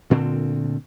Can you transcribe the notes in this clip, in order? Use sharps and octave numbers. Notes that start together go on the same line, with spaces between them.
D2 A#2 D3 C4